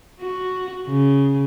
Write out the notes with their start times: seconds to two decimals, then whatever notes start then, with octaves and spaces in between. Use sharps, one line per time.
0.20 F#4
0.87 C#3